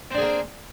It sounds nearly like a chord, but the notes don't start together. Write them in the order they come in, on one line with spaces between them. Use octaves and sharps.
C4 D4 G#4 A#3